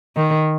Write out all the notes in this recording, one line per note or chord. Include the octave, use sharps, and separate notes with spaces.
D#3